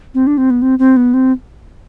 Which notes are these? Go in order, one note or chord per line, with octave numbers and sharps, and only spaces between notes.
C4
D4
C4
B3
C4
C4
B3
C4